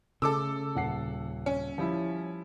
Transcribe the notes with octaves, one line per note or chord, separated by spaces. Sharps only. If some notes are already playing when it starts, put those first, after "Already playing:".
C#3 A3 A4 D6 E6
D#1 F#5 C7
C#4
F3 G3 E4